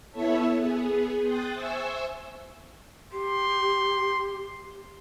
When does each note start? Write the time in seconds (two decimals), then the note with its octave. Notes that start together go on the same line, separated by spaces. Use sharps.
0.12 B3 E4 A4 C#5 E5 A5
0.57 B3 G#4
1.22 G5 C6 D#6 F#6 A6
1.53 C5 E5 G#5 C#6 E6
3.13 G4 C6